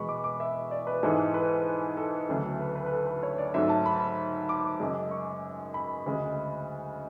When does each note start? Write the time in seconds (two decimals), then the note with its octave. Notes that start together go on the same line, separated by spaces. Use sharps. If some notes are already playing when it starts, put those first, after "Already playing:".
Already playing: E2 B2 G#3 B5 C#6
0.09 D6
0.24 D6
0.40 E5
0.71 D5
0.87 B4
1.03 G#2 E3 G#3 A4
1.34 B4
1.97 A4
2.29 D2 C#3 F#3 A3
2.60 B4
2.75 B4
2.86 B4
2.92 A4
3.07 B4
3.23 C#5
3.38 D5
3.54 G#2 F#3 A3 E5
3.69 A5
3.86 B5
4.49 D6
4.80 F#2 C#3 G#3
5.11 C#6
5.74 B5
6.06 D2 C#3 G#3